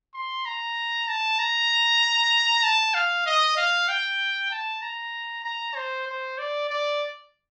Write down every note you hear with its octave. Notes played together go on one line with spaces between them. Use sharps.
C6
A#5
A5
A#5
A5
F5
D#5
F5
G5
A5
A#5
A#5
C5
C5
D5
D5